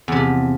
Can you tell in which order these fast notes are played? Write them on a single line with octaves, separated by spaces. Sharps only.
E2 C3 F3